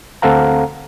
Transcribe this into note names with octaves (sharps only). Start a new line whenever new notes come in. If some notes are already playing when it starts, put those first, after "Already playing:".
D2 C4 A4 F5 F#5 A#5